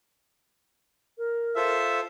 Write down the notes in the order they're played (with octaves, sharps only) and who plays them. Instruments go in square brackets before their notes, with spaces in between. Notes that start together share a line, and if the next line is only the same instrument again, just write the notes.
[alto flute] A#4
[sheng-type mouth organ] F4 A4 C5 [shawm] E5